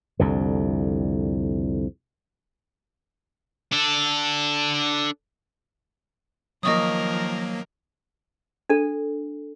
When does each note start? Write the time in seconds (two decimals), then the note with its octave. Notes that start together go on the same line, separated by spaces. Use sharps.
0.20 C2 F2 D3
3.72 D4 A4
6.63 D#3 F3 F#3 A#3 A#4 D#5 C#6 D#6
8.69 D4 A4